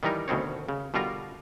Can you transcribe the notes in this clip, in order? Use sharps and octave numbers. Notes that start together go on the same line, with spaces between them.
D#3 E3 G3 D#4 A#4
D2 B2 D#3 C4 C#5
C#3
B2 D3 G3 F4 A#4 A#5